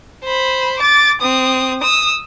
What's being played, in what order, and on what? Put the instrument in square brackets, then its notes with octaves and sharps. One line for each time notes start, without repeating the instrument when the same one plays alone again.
[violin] C5 B5
D6 A6
C4 D#6
D#6 E6